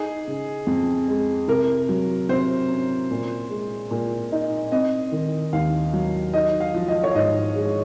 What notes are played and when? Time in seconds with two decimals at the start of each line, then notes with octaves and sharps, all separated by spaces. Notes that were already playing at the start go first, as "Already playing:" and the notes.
Already playing: D#4 G#4
0.27 C#3
0.67 F2
1.08 G#3
1.48 C3 A#4
1.89 F#3
2.29 C3 C5
2.70 C#4
3.11 A#2
3.50 G#3
3.91 A#2
4.32 D#4
4.72 C4 D#5
5.12 D#3
5.53 D#2 F5
5.93 F#3
6.34 D#4 D#5
6.60 F5
6.74 F3
6.88 D#5
7.04 C#5
7.14 G#2 D#5
7.56 G#3